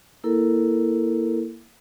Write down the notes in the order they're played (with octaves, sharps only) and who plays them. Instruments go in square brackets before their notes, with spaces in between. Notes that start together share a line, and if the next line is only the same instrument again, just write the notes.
[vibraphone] A#3 E4 A4 A#4